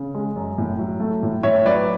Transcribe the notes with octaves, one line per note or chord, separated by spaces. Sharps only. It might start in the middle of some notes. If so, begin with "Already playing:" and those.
Already playing: C#3
G#3
F#2
A2
F#3
A3
A2
A2 C#5 E5
F#3 B4 D5